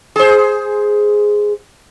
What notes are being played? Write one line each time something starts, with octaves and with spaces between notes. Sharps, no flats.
G#4 C5